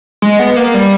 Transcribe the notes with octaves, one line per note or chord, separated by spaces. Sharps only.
G#3
B3
A#3
G3